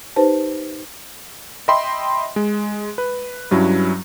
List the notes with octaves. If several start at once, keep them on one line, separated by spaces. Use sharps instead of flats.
D#4 G4 B4 C5 A5
D#5 E5 G5 B5 C6
G#3
B4
G2 F#3 C#4 E4